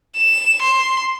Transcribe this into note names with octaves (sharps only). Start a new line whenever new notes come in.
E7
C6